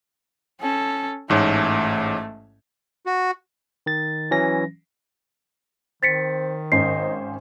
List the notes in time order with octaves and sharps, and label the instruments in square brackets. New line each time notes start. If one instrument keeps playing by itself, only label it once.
[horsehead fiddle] C#4 A4
[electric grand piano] A1 G#2 C#5 [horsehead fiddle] A3
[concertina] F#4
[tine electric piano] D#3 A6
E3 F#3 C#4 A#6
[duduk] D#3 [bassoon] C4 [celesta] A6 B6 C#7
[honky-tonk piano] G#1 C#4 C5 [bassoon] D#4 [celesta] C7